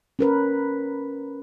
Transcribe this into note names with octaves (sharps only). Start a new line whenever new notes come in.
C#4 A#4 B4